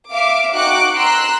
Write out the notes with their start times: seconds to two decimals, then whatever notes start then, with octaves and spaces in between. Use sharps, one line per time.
0.11 E5 F5 D6
0.54 D#4 F#4 G5 D6 F#6 C#7
0.94 A#5 C6 E6 F#6